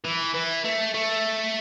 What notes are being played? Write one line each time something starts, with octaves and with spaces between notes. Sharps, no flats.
E3
E3
A3
A3